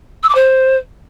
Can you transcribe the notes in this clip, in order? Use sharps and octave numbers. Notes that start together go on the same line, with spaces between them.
E6
D6
C5